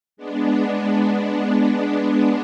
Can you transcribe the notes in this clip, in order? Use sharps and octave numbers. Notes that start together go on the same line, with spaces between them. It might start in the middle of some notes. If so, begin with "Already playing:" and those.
G#3 B3 D4